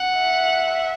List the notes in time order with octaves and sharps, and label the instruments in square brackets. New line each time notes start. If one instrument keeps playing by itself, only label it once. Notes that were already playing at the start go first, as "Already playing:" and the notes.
Already playing: [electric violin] F#5
[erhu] E5